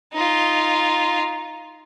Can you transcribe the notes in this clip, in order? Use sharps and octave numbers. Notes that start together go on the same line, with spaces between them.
D#4 F4